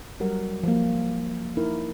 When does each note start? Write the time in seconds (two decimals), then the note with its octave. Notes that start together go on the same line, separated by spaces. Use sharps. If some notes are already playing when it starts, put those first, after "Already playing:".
0.20 F#3 G3 A#4 F#5
0.63 F3 A#3
1.57 D#4 E4 A#4